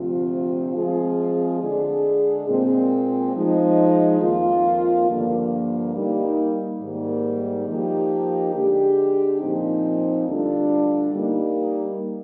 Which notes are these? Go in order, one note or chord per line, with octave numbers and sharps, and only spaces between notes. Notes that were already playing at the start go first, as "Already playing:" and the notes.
Already playing: D2 C3 F3 C4 F4
F3 G#3 C4 F4 G#4
D3 G#3 D4 G#4
A#2 G#3 C4
F3 G#3 D#4
F2 D#3 A#3 F4
G2 D3 F3 A#3
G3 A#3 D#4
G#2 D#3 G3 A#3
F3 A#3 D#4 G4
D3 G#3 D4 G4
A#2 F3 C4 D#4
D2 D3 G3 D4 F4
G3 A#3 D#4